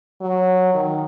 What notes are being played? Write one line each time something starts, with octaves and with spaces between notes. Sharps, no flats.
F#3
D#3